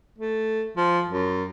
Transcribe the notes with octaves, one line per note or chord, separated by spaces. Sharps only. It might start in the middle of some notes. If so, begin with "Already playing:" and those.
A3
F3
F#2